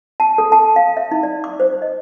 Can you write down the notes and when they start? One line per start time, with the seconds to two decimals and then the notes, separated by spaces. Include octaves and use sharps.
0.20 A5
0.38 A4
0.52 A5
0.76 F5
0.97 E5
1.11 D#4
1.23 D5
1.44 D6
1.60 C5
1.82 D#5